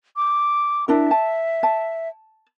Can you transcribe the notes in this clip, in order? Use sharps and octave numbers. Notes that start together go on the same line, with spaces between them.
D6
D4 E4 A#4 E5
A5
A5